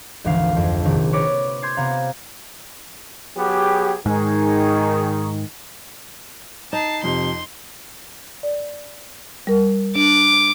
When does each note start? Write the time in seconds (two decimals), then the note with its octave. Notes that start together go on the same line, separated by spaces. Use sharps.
0.24 G#1 D2 E3 F3 F5 C7
0.57 F2
0.85 A#1 C3 D#3
1.13 B4 C#5 D6 A6 A#6
1.62 C6 G6 G#6 C7
1.77 C3 B3 F5 A#5
3.37 F#3 B3 G4 G#4
4.06 G#2 D#3 D#4 G#4 C#6
6.73 D#4 A5 C7
7.04 F2 C3 C6
8.43 D5
9.47 G3 A#4
9.96 D4 D6